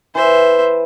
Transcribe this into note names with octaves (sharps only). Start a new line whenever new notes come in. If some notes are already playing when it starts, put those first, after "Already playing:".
E3 C5 E5